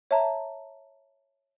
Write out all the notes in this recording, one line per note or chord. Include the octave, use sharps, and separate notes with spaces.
C#5 E5 A5 A#5